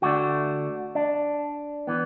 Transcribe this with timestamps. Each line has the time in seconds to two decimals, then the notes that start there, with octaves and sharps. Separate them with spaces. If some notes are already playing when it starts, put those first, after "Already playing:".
0.02 D2 D3 A3 D4 F#4
0.95 D4
1.87 E3 B3